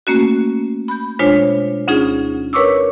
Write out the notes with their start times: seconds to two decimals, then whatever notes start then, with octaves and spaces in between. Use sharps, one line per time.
0.07 A3 A#3 C#4 F#4
0.88 B5 G6
1.19 B2 G#3 D4 F4 C5 C#5
1.88 D2 C#4 D#4 F4 G#4
2.53 A#4 B4 C#5 C#6 D6 E6